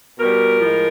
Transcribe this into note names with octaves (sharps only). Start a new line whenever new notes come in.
B2 G3 A#4
A2 F3 G#3